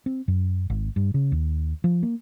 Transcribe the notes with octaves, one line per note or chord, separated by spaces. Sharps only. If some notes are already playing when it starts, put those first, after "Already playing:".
C4
F#2
G#1
G2
C#3
D#2
F3
A#3